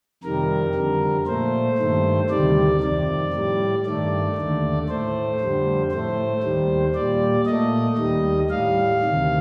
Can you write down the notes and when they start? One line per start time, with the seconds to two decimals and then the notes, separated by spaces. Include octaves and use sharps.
0.23 F2 C3 D#3 G3 A#4
0.75 F2 D3 G3
1.27 A#2 A3 C5
1.78 G2 D#3 A3
2.29 D2 C3 D#3 G3 D5
2.81 F2 C3 D#3 D5
3.33 A2 G3
3.85 G2 D#3 A3 D5
4.36 D#2 D3 A3
4.89 A2 A3 C5
5.40 F2 D3 G3
5.91 A2 A3 C5
6.43 D#2 D#3 G3
6.94 A#2 G3 D5
7.46 A#2 A3 D#5
7.98 D#2 D#3 G3
8.50 A2 G3 F5
9.01 D2 C3 D#3